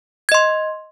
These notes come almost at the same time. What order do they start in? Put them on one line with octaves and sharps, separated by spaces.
G#6 D#5 C6